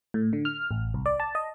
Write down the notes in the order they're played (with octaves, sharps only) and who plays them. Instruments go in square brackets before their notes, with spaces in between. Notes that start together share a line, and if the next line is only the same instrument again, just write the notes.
[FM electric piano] A2
D3
F6
A1
C2
D5
A5
D#5